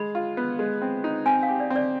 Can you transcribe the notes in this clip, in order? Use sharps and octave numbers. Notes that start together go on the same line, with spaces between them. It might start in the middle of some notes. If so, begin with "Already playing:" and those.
Already playing: G#3 B5
F4
B3
G#3
C4
D#4
C4 G#5
F5
G4
D5
C4
D5